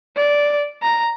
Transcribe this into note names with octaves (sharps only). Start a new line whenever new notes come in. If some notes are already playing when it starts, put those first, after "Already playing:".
D5
A#5